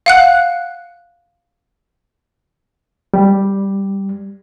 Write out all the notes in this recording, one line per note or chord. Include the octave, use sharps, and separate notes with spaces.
F5 F#5 F#6
G3